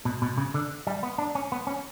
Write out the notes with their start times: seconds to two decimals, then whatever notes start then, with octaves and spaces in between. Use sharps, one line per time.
0.05 B2
0.22 B2
0.37 C#3
0.54 D3
0.87 G3
1.03 B3
1.18 D4
1.35 C#4
1.52 B3
1.67 C#4